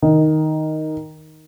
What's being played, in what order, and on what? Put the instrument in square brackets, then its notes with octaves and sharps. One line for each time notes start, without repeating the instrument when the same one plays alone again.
[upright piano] D#3